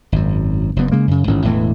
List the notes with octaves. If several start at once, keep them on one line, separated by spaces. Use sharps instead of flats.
G#1 F#2
F#1 F#2 B3
C#3 G#3 A#3
F#2 C#3
A1 G#2 D#3 C#4
E1 A2 E3